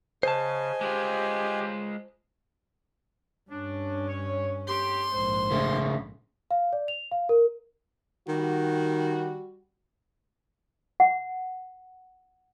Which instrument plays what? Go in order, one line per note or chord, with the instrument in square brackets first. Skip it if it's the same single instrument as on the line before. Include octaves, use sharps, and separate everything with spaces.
[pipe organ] C#3 [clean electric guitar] C5 A5 [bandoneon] D#5 G#5
[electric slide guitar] G#3 F4 [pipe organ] G4
[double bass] G2 C#4 [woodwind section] D4
[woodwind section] C#5
[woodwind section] G4 [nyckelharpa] C6
[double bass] A#1 G#2 [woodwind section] C5
[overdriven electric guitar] C#3 A3
[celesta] F5
D5
F7
F5
A#4
[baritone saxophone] D#3 [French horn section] G3 F#4
[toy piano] F#5